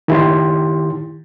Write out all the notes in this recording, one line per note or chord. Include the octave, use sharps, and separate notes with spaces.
D#3 E4 G4 C6